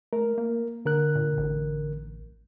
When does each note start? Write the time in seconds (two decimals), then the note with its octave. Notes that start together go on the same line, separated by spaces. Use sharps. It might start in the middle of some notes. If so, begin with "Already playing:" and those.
0.13 A3 A#4
0.38 A#3
0.85 D3 A#4 F#6
1.15 A#2
1.38 A1